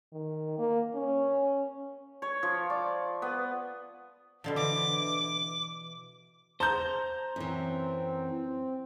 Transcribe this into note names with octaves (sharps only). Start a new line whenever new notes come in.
D#3
A#3
C#4
C#5
F3
D5
B3
B2 D3 F3
E3 D6
C5 A5 A#5 G6
F#2 E3 C4